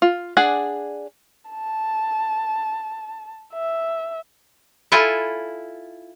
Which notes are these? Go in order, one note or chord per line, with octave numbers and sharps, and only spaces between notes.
F4
D4 G#4 D5 F#5 G#5
A5
E5
E4 F4 A4 G#5